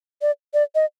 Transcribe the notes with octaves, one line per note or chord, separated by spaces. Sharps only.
D5
D5
D#5